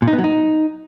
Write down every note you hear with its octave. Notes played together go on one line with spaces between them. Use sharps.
A#2
D#4
B3
F#3
D#4